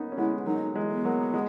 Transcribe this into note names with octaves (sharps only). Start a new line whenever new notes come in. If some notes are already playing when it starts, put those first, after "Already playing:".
Already playing: A#3 B3 C#4 D#4
C#4
G#3 B3 E4
B3
F#3 A#3 D#4
E3 G#3
B3
F#3 A#3
G#3